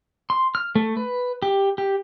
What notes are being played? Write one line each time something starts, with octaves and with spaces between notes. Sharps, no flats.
C6
F6
A3
B4
G4
G4